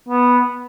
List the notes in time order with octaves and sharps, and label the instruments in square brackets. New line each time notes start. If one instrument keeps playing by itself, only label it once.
[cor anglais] B3